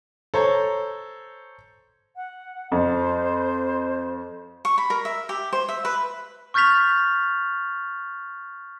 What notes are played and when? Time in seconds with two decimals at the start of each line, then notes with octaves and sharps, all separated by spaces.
0.34 A4 C5 C#5 A#5
2.16 F#5
2.72 F2 C5
4.65 C#6
4.78 B5
4.90 A#4
5.05 E5
5.29 G4
5.53 C5
5.69 E5
5.85 B4
6.54 C#6 F6 G6 A6 B6 F7